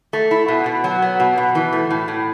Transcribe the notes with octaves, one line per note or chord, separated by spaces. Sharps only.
A3
E4
B2
B2
F#3
B3
B2
B2
E3
A3
A2
A2